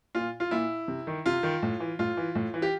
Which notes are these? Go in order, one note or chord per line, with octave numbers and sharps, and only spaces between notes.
A#2 F4
F4
A#2 E4
C3
D#3
C3 F4
D#3
A2
E3
A2 F4
E3
A2
E3
G4